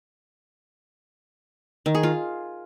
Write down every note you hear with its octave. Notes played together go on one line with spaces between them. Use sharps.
D#3
G#4
F4